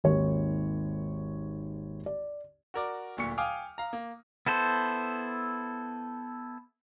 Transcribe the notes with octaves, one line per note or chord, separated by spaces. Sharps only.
G#1 D#2 C#5
D5
F#4 A#4 D5
D1 D2 A#2 C#6 C#7
F5 G5 G#5 D6 D#6 F6
F5 A#5
A#3
B3 E4 A4 C5